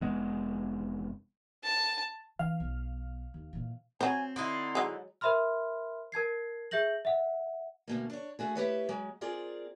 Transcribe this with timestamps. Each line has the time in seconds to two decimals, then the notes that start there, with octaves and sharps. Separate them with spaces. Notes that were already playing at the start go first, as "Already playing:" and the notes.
0.01 F1 G#3 B3
1.64 A5
2.39 E3 D4 F5
2.60 B1
3.34 D#2
3.53 A#2 E3
4.01 F#3 C4 C5 G#5
4.36 D3 D#4 E4 C6
4.75 F#3 G#3
5.21 A#4 C5 E5 B5 C6 F6
6.12 A#4 A5 G#6 C7
6.71 G#4 E5 G6 A#6 F#7
7.05 E5 F#5
7.88 D2 B2 A#3
8.10 D4 C#5
8.39 A3 F#4 G#4
8.55 E4 G4 B4 C#5
8.89 F#3 G#3
9.21 C4 F4 G#4 A#4 D5